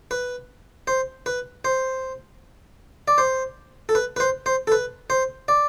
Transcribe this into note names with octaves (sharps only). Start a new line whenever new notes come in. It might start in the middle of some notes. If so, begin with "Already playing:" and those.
B4
C5
B4
C5
D5
C5
A4
B4
B4
C5
C5
A4
B4
C5
D5